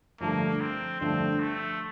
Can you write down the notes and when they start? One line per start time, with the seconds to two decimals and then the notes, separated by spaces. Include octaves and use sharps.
0.20 G2 D3 F3 A3 A#3
0.61 C4
1.00 G2 D3 F3 A3 C4
1.40 A3